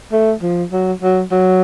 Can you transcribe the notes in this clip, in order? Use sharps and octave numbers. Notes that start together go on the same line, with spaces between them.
A3
F3
F#3
F#3
F#3